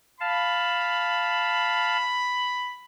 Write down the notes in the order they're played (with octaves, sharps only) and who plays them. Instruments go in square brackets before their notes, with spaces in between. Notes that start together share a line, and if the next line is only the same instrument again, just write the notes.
[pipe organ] F5 A5 [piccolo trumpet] B5